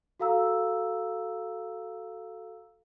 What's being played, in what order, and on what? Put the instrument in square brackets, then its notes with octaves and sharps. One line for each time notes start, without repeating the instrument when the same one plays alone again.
[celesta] F#4 A4 F5 A#5 E6